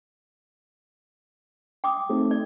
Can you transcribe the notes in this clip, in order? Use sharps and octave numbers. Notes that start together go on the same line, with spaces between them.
G5 D6 D#6
A3 C4 D#4
D5